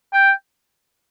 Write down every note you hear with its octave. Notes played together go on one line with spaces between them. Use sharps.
G5